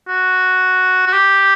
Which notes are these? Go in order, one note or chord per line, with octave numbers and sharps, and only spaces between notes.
F#4
F#4
G4